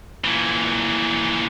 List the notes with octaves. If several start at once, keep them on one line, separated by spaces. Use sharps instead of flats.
A#2 E3